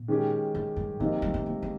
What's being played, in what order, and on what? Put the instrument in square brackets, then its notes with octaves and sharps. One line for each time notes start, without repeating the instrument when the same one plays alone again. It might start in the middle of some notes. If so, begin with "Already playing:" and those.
Already playing: [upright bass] A#2
[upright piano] D#3 G#3 C#4 G4
[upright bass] C3
G2
[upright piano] C3 D#3 A#3 D#4 [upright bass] F3
[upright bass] G3
A#3
G#3
G#3